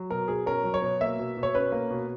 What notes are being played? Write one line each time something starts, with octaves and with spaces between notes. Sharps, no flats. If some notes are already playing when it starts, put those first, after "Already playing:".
Already playing: F#3
B2 A#4
B2 G#4
C#4 A#4
F#3
C#5
B2
A#3 E5
B2
B2
C#5
C#4 B4
A#3
B2